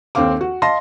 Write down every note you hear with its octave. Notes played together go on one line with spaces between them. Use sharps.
D#2 C4 A4 F5 D6
F#4
D#5 F5 A5 C6 A#6